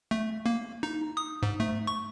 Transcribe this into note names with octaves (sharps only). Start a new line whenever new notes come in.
A3
A#3
D#4
D#6
G#2
A3
C#6